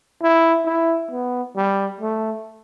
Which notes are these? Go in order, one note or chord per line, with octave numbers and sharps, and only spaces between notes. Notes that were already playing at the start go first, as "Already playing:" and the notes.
E4
E4
B3
G3
A3